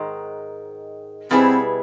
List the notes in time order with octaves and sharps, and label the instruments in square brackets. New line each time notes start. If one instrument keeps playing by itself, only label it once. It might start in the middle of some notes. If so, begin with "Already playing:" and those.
Already playing: [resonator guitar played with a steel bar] G#2 D#3 G#3
[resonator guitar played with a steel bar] B2 G3 B3 E4 G#4 [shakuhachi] C4